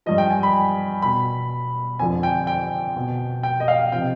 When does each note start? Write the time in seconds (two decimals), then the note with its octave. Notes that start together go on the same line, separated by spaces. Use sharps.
0.06 G2 F3 D#5
0.18 G5
0.30 G#5
0.43 B5
1.02 B2 B5
1.99 F2 D3 F3 G#5
2.23 G5
2.47 G5
2.96 B2
3.43 G5
3.60 D#5
3.68 F5
3.92 C3 F3 G5